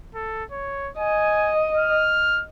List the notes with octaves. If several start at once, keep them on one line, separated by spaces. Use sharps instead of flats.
A4
C#5
D#5 G#5
F6